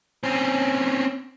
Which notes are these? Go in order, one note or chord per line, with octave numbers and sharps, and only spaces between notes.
C4 C#4